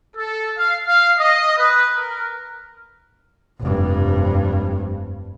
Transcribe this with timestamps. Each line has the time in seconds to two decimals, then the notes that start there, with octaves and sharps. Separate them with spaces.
0.17 A4
0.59 F5
0.88 F5
1.19 D#5
1.58 B4
1.96 A#4
3.60 F1 G2